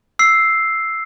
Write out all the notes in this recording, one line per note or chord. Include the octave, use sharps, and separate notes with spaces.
E6 C7